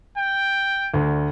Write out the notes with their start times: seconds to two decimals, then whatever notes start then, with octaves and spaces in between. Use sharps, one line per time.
0.18 G5
0.94 D2